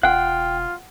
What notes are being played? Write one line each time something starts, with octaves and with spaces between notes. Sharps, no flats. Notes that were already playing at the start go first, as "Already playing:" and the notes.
E1 F4 F#5 G5 F#6